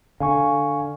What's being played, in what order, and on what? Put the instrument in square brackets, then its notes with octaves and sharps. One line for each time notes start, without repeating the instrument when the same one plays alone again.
[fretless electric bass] D3 [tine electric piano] F5 G#5 C#6